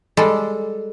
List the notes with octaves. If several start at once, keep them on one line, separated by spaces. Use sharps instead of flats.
G3 G#3 A4